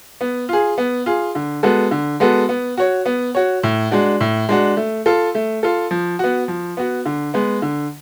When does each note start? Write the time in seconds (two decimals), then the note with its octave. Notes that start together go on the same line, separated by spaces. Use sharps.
0.21 B3
0.49 F4 G#4
0.78 B3
1.06 F4 G#4
1.35 D3
1.63 G#3 B3 F#4 A4
1.91 D3
2.20 G#3 B3 F#4 A4
2.49 B3
2.77 F#4 C#5
3.06 B3
3.35 F#4 C#5
3.63 A2
3.91 G#3 D4 F#4
4.21 A2
4.49 G#3 D4 F#4
4.77 A3
5.06 F4 A4
5.35 A3
5.63 F4 A4
5.91 F3
6.19 B3 F#4
6.48 F3
6.77 B3 F#4
7.06 D3
7.34 G#3 B3
7.62 D3